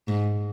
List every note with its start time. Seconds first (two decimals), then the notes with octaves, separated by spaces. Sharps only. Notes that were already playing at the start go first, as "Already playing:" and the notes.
0.08 G#2